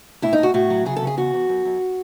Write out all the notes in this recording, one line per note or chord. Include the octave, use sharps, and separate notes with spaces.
A2 E4
D#4
A2 F#4
A2 F#4
F#3
C#3 G#4
A4
C#3
G#4
E2 F#4
E2
F#2
F#2